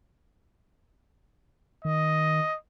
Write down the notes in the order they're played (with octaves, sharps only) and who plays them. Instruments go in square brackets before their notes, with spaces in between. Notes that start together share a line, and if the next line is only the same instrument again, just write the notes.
[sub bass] D#3 [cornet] D#5